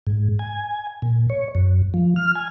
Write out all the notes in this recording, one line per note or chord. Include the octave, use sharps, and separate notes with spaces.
G#2
G#5
A#2
C#5
F#2
F3
F6
G#5